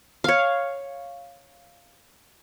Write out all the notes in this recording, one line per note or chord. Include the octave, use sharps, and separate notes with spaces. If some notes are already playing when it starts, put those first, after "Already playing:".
C#5 F5